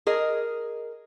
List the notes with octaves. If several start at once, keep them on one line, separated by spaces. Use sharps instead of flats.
G#4 A#4 D#5